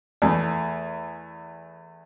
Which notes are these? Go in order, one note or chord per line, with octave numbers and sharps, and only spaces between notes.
E2 A3